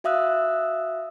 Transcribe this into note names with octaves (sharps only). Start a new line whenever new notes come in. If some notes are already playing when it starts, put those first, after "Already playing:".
F#4 E5 F5 D#6 E6 F#6